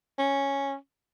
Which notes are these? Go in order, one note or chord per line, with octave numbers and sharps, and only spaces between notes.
C#4